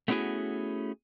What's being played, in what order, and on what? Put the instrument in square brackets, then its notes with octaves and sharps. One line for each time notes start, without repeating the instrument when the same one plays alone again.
[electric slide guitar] A3 B3 C#4 E4 F#4 G#4